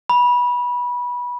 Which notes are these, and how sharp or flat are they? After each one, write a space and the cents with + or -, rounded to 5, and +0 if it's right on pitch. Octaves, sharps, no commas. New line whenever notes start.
B5 -20